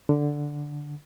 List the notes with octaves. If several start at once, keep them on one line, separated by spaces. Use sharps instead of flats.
D3